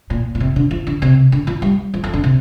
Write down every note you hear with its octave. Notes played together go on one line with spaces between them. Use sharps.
A#2
A#2
C3
D3
F3
D3
C3
D3
F3
G3
F3
F2
D3
C3